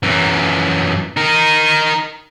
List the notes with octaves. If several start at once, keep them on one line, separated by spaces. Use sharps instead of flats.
F#2 E3
D#4 A#4